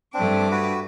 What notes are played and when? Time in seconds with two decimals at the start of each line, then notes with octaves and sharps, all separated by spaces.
0.14 G2 A3 C4 D4 D6
0.51 F#4 B4